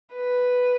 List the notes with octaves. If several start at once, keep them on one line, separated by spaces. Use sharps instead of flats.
B4